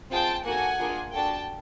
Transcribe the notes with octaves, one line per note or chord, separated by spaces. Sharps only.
C4 F4 G#4 G5 A5
A#3 D#4 F#4 A4 F#5 G#5
A#3 D4 F4 G#4
D4 F#4 A4 G5 A5